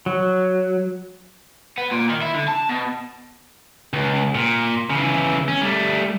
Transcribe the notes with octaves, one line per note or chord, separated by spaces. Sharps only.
F#3
B3
A#2
D#3
E4
D3
A5
B2
C#2
A#2
C#3 E3
C#4
G3 A3